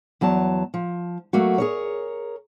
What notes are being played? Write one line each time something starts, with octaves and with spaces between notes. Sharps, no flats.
E2 F#3 C#5 A5
F3
F#3 A3 A#3 F#4
G#4 A#4 C#5